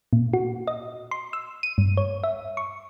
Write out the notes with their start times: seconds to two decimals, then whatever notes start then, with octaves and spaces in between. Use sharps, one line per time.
0.13 A#2
0.33 F#4
0.67 D#5
1.11 C6
1.33 E6
1.63 D#7
1.78 G2
1.97 C#5
2.24 E5
2.57 C#6